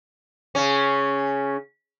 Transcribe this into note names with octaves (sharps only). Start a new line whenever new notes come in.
C#3 C#4